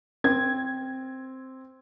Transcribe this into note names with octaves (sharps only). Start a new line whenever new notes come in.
C4 G#6